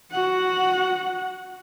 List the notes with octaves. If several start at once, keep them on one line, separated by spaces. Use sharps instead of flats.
F#4 F#5